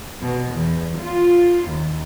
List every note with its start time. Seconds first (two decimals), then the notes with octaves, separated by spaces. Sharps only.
0.22 B2
0.53 E2
0.99 F4
1.69 D#2